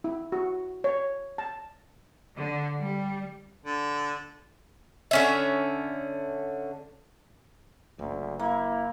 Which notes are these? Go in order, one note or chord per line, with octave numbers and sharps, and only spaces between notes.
E4
F#4
C#5
A5
D3
G3
D3
D3 C#4 E5
F#1 D2
A#3 E4